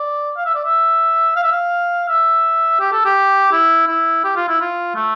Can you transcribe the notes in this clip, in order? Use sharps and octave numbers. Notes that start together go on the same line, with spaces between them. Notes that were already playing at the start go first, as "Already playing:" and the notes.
Already playing: D5
F5
E5
D5
E5
F5
E5
F5
E5
G4
A4
G4
E4
E4
G4
F4
E4
F4
A3